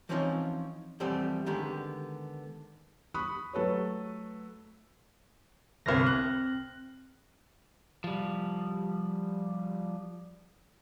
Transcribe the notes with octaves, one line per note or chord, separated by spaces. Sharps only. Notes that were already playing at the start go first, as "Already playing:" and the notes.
E3 F3 C4 C#4 D#4 F4
E2 F3 G3 A3 C4 G4
D3 D#3 G#3 B3 G4
B5 C#6 D#6 F#6
F#3 A3 A4 B4 C#5
G1 C2 C4 F6 A#6
F#6
F3 G3